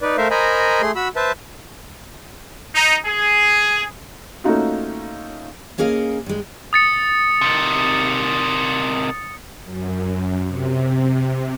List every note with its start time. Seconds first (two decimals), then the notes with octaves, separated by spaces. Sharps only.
0.01 D#4 B4 D5
0.18 A3 A#4 C5 E5 F5
0.30 A#4 C5 D#5 G#5 A#5 B5
0.82 A3 G#4 C6
0.96 F#4 B5 E6
1.16 B4 C5 E5 A5
2.75 D#4
3.06 G#4
4.44 A3 A#3 C#4 D#4 F4 F#4
5.78 A#3 C#4 G#4 A#4 D#5 F5
6.26 G2 G#3
6.73 D#6 A6 C#7
7.41 C3 D#3
9.64 F#2
10.48 C3